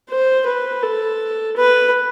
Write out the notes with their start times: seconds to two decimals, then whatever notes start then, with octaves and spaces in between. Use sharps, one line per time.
0.10 C5
0.47 B4
0.83 A4
1.57 B4